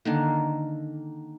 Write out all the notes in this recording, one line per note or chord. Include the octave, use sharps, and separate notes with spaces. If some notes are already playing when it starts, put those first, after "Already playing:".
D3 D#3 A#3